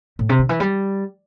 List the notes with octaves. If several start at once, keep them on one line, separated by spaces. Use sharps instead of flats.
A2
C3
D3
E3
G3